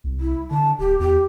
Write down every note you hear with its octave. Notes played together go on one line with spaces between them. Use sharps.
C2
E4
D3 A5
D1 G4
E2 G4